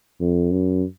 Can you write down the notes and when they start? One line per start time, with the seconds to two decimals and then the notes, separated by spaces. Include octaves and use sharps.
0.20 F2
0.51 F#2